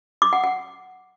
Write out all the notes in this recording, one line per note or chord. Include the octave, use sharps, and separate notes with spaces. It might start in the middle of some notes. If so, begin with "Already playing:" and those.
D6
F#5
F#5